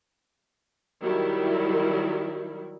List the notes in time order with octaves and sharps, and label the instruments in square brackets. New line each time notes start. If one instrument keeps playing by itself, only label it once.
[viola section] D#3 F#3 G3 E4